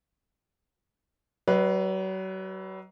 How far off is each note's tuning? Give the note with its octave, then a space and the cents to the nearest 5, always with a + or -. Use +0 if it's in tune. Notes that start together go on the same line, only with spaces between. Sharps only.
F#3 +40 B4 +0 D#5 +15